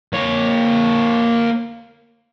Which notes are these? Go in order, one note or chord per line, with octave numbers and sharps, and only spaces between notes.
A#3 C#5